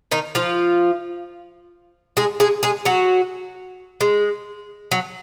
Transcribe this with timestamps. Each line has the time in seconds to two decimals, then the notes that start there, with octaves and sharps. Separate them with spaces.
0.11 D#3 D#4
0.35 F3 F4
2.17 G#3 G#4
2.40 G#3 G#4
2.63 G#3 G#4
2.85 F#3 F#4
4.01 G#3
4.92 F#3